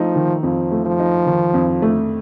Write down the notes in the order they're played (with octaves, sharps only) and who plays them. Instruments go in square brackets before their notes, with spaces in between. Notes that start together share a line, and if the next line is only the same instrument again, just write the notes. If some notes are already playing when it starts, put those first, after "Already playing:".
Already playing: [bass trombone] F3 [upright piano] A3 D#4
[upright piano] D#3
[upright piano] F2 [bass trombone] F3
[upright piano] A3
[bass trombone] F3
[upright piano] D#4
D#3
F2
A3